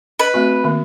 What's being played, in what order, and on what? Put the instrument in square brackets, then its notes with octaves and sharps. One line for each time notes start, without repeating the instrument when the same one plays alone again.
[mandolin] B4 [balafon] D#5
[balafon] A3 C4 F#4
D#3 A#3